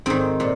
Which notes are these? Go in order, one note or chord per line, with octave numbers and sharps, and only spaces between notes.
G#2 D#3 C4
A#2